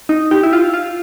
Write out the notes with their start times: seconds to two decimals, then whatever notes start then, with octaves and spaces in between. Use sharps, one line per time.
0.09 D#4
0.31 G4
0.43 E4
0.53 F4
0.74 F4